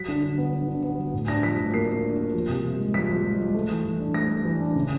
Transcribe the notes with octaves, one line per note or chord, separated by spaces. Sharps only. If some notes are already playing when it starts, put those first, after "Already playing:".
Already playing: F#3 B6
D3
D3
B3
D3
D3
B3
F#3
A2
D4 A#6
F3 B6
A2
A#3 C7
A#3
D4
A#3
F3
C3
F3
G#3
F3 B6
F3
G#3
G#3
A3
E3
E3
D4
A3 A#6
A3
E3
D4
C#3